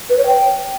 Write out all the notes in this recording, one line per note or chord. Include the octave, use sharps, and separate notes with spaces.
B4
C#5
G5